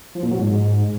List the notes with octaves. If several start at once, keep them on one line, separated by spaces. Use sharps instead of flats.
F3
A#2
F#3
G#2